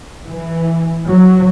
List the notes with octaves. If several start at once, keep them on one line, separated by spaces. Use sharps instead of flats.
E3
F#3